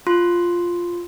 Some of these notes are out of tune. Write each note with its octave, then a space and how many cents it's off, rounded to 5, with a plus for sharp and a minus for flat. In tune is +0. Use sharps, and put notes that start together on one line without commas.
F4 +0 C6 +0